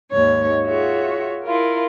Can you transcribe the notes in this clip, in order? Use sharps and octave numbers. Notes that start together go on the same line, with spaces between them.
D#2 G#2 C#5
F4 F#4 G#4 C#5 E5
E4 F4 A#4